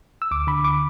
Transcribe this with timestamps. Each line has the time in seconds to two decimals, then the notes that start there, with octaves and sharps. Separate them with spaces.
0.22 E6
0.31 D2 D6
0.47 D3 B5
0.64 D6